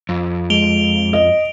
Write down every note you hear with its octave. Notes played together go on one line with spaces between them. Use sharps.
F2
G#3 D7 F7 G7
D#5 F7 G7